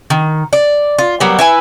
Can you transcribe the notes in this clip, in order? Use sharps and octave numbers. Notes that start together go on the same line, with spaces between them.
D#3
D5
F4
F#3 G3 A#3 B3
E4 B4 G#5